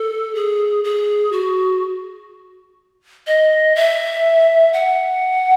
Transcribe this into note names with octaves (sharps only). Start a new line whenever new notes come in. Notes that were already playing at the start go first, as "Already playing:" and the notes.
Already playing: A4
G#4
G#4
F#4
D#5
E5
F#5